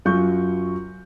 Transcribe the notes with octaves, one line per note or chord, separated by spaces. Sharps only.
F#2 F#3 F4 C#6 G6